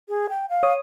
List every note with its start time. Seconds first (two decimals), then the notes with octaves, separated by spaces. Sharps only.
0.09 G#4
0.29 G5
0.50 F5
0.63 C#5 D#6